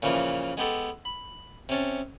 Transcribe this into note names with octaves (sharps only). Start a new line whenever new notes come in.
A#2 C#3 E3 F3 A#3
G#3 B3 G4 A4
B5
C3 C#4 A5